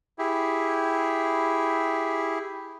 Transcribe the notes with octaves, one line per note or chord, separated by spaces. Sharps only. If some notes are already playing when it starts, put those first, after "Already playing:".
E4 G4 G#4